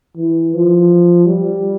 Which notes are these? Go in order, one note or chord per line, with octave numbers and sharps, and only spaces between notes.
E3
F3
G3